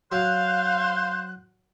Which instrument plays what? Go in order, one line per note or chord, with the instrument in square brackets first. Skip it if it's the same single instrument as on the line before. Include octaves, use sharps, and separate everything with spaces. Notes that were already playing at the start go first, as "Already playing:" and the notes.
[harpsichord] F#3 [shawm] C5 [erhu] F5 [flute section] F#6